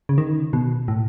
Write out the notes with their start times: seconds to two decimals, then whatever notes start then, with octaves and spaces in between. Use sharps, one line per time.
0.09 C#3
0.18 D#3
0.53 B2
0.88 A2